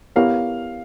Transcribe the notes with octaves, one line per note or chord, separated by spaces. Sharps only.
B3 E4 G4 A#4 C#5 F5